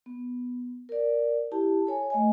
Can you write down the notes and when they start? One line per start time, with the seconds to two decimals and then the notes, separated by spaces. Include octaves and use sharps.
0.06 B3
0.89 A#4 D5
1.52 E4 G4 A5
1.87 A4 C#5 G#5
2.10 A3 D#5 G#5